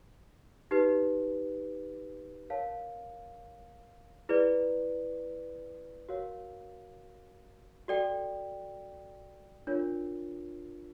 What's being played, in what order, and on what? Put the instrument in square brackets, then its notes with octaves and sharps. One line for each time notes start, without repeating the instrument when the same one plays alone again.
[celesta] D#4 G4 B4
A#4 C#5 F5 A5
E4 G#4 B4 D5
F#4 A#4 C#5 F5
F#4 A4 D5 G5
D4 F4 A#4 C#5